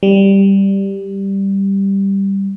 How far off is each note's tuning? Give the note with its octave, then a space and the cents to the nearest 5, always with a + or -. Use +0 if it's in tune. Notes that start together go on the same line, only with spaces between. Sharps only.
G3 +0